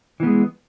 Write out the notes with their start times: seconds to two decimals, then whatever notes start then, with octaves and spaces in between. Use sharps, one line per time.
0.20 E3
0.23 B3
0.26 G#3